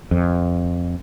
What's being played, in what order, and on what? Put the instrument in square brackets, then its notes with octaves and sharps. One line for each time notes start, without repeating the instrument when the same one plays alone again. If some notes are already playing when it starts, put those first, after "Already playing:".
[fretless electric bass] F2